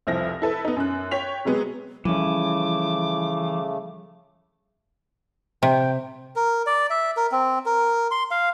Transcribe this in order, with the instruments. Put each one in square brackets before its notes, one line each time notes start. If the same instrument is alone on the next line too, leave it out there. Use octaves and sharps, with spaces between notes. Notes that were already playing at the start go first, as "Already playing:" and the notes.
[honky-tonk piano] F1 C2 F3 E4 A#6
E4 A4 B4
B3 D#4
F#2 F#6
C#5 G5 B6 F7
C3 F#3 G#3 B3
[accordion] C#3 A3 [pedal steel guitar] E3 [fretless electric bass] F3 G3 C#4 [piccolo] D6
[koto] C3 [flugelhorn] G5
[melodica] A#4
D5
E5
A#4
C4
A#4
C6
F5